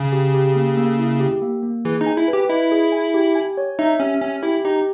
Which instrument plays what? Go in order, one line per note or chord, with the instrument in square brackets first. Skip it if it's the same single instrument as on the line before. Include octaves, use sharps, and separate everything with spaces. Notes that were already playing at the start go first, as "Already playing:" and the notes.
Already playing: [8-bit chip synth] C#3 [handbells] G#5
[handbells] G4
G4
A#3
A#3
E4
G4
A#3
A#3
[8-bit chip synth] E3 [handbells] G#4
[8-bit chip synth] D#4
[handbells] G#5
[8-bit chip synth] E4
[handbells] B4
[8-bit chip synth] G4
[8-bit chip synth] E4 [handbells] D#5
[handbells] G#4
G#5
G4
G#5
C#5
[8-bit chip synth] D#4 [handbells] E5
[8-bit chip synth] C#4 [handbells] G4
[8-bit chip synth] C#4 [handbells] G#5
[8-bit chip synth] E4 [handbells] G4
[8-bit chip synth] D#4 [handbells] G4